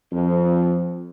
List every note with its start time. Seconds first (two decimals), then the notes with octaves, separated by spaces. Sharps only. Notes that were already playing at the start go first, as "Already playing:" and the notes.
0.11 F2